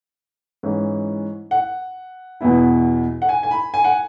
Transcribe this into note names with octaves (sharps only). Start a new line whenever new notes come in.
G#2 E3 C#4 E4
F#5
E2 B2 B3 E4
F#5
G#5
G#5
B5
G#5
F#5